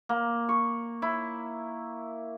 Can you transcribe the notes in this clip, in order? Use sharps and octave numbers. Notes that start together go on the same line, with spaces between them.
A#3
C#6
E4